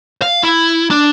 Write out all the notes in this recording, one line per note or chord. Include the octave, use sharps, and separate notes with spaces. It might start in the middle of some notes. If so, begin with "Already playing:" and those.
F5
E4
D4